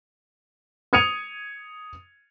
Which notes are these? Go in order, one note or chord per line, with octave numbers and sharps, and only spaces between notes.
D#6 G#6 C#7 D#7 F7